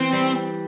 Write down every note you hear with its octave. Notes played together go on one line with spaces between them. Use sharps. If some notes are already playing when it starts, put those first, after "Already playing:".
Already playing: E3 C4
G3